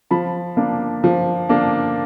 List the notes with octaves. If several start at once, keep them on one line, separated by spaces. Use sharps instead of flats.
F3 A5 B5
A#3 D4
F3
A#3 D4